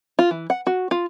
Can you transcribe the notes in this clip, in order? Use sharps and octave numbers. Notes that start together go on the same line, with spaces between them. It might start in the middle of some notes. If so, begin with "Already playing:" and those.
F4
E3
F#5
F#4
F4